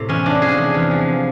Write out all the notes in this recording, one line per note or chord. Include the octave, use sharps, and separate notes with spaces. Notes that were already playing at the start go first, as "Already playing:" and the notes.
Already playing: A2 C3
E2 C#4
F3 D4
E2 G#4
C3
E2
F3